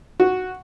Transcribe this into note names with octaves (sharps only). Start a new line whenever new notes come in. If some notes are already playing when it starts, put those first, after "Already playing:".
F#4